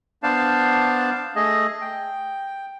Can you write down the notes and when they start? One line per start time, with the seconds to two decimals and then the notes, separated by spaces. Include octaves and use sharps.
0.23 B3 D4 C5 D5 F5 A5
1.36 A3 G#4 D#5
1.81 G5